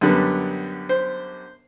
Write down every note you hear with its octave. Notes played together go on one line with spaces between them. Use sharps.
F#2 D3 G3 B3
C5